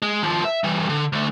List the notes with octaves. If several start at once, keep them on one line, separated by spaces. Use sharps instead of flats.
G#3
D#2 F3
E5
E3 G3
D3
D2 A3